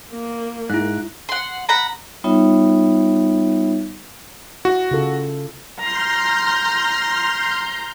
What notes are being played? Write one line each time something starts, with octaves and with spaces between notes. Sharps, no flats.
A#3
G#2 E4 F#6
F#5 C6
F#5 A#5 B5
G3 B3 D#4 F4 C#5 E5
E4 F#4
C#3 F4 A4
A#5 C6 F6 G6